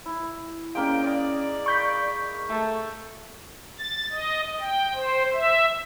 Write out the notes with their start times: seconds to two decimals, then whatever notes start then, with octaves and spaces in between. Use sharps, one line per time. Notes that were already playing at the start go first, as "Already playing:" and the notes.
0.06 E4
0.75 G#3 A#3 C#4 D5 F5 G5
1.04 D5 D#6
1.66 B5 C#6 G6 B6
2.49 A3 A4
3.79 A6
4.10 D#5
4.60 G5
4.95 C5
5.33 E5